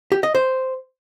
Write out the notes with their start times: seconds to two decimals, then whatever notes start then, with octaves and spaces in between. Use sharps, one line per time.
0.12 G4
0.23 D#5
0.35 C5